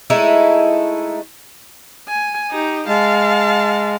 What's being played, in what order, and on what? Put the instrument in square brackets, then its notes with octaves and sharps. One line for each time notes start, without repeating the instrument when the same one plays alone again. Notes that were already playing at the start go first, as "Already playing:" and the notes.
[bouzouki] G#3 A3 D#4 E4
[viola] G#5
D#4 G4
[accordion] G#3 [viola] F5 A5